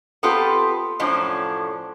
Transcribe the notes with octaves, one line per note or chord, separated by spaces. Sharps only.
B3 C4 F4 G4 A4 B4
F#2 A2 F3 C#4 D4